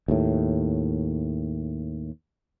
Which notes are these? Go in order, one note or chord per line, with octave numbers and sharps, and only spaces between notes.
D#2 A2